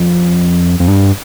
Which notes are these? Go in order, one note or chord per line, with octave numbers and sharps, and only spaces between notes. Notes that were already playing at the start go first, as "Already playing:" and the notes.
Already playing: F2
F2
G2